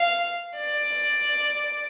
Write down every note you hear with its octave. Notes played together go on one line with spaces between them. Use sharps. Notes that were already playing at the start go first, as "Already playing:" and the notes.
Already playing: F5
D5